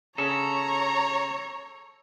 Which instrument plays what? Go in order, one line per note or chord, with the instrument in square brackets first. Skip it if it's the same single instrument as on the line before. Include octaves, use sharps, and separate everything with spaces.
[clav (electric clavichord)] C#3 C#4 [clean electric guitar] A4 [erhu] C#5 [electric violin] A#5